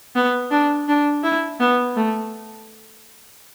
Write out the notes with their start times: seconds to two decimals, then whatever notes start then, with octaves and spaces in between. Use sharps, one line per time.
0.15 B3
0.51 D4
0.88 D4
1.24 E4
1.60 B3
1.96 A3